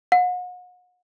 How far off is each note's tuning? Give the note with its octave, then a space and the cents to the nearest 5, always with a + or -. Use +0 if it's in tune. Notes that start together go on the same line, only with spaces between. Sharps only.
F#5 -40